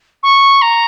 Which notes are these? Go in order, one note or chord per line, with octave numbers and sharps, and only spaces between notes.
C#6
A#5